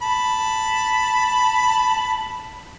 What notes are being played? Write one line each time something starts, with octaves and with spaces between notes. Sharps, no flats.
A5 B5